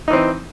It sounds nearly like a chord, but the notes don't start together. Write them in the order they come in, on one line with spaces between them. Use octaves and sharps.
D#4 E3 C4